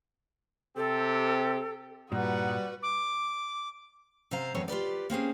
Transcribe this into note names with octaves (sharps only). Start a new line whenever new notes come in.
C3 C4 G4 A4
G2 A#2 G3 D#4 F#4 B4 F#5 D#6
D6
C3 C5 F5 A#5
F2 E3 G#3 B3 C#5
F4 G4 B4 D5
A#3 C4 C#4 G#4